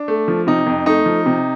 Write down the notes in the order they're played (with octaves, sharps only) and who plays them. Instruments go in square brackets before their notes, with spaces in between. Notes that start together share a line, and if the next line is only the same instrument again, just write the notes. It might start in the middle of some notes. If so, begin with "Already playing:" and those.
Already playing: [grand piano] D4
A3
F3
C3 D#4
F2
A3 D#4
F3
C3